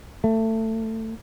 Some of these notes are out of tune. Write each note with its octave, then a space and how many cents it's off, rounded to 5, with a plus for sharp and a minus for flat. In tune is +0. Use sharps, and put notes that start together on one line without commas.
A3 +20